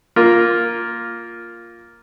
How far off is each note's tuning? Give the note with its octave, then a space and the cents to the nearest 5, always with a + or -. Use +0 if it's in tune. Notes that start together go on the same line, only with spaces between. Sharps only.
A#3 +0 F4 +0